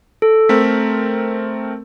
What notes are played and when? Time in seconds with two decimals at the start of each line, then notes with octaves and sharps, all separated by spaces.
0.22 A4
0.49 A3 C4 A#4 B6